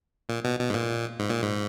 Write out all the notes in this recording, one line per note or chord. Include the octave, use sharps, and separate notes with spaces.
A#2
B2
B2
G#2
A#2
G#2
A#2
G#2